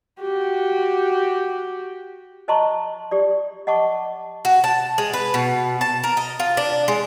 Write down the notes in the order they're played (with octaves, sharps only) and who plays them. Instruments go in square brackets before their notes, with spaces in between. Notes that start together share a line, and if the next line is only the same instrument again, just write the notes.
[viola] F#4 G4
[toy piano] C5 D#5 A5 A#5 C6 C#6
G4 D5
D#5 F#5 A5 C#6 D6
[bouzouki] F#4
A5
G#3
B4
B2
A5
A#4
D#5
F4
D4
G#3